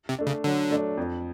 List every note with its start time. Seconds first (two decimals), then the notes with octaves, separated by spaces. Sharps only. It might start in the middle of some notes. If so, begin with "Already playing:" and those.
0.09 C3
0.19 A3 D4
0.27 C#3
0.44 D3 F#3
0.71 A3 D4
0.98 F2